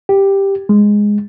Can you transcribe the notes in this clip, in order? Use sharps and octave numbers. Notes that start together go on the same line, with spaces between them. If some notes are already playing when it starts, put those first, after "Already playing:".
G4
G#3